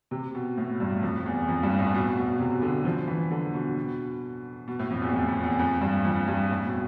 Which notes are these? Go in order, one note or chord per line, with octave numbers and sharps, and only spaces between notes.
C3
B2
A2
G2
F2
E2
F2
G2
A2
B2
B2
C3
D3
F3
E3
D3
B2
B2
A2
F2
E2
F2
F2
E2
F2
G2
F2
G2
A2
B2